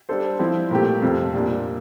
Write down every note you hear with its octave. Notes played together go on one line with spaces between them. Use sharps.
G3 D4 A4 C5
F3 C4 E4
A#2 A3 C4 G4
F2 C3 F3
A#2 G3 D4